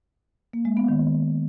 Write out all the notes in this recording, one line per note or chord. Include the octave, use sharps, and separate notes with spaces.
A#3
G#3
B3
D#3